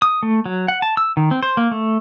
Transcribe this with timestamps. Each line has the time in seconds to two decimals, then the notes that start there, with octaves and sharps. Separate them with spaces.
0.02 D#6
0.23 A3
0.46 F#3
0.68 F#5
0.82 A5
0.97 E6
1.17 D#3
1.31 C4
1.43 C5
1.57 A#3
1.71 A3